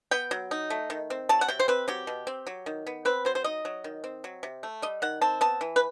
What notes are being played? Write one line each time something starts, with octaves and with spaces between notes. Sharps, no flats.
B3 G5
F#3
D#4
A3
D#3
C4
F#3 A5
F#5
C3 G5
C5
C4 B4
F#3 G4
B2
C4
F#3
D#3
B3
C4 B4
F#3 C5
C5
D#4 D#5
F#3
D#3
C4
F#3
C3
A3
G3 D#5
D#3 F#5
C4 A5
B3 A5
E3
B4